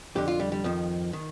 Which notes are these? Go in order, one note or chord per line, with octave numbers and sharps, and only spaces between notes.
F2 D3 G4
F4
G3
G3
F2 D#3 F3
D#3